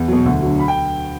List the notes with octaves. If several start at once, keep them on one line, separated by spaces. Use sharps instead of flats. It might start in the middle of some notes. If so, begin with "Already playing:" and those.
Already playing: E2
B2 F#3
D2
D3 F#3
B5
G5